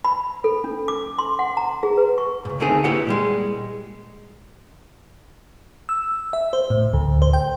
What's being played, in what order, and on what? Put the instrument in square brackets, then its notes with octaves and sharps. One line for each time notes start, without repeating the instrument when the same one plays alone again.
[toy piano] B5
A4
C#4
D6
C6
F#5
A#5
G#4
B4
C#6
[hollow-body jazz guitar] C#2 G#2
D3 D#3 A3 C4 G#4
A#3 E4 G4 B4 F#5
A#2 G3 G#3
[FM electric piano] E6
E5
C5
A2
D2
C5
G5